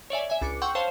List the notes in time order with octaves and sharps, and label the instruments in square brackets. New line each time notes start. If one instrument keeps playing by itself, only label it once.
[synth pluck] C#5 D5 E5 G#5
E5 G#5
C#2 D4 D6 C#7
F#5 G5 C6 C#6 E6 G6
C5 C#5 F5 A5 C6